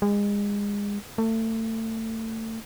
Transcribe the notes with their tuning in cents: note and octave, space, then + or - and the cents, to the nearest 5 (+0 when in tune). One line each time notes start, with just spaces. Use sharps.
G#3 -30
A3 +30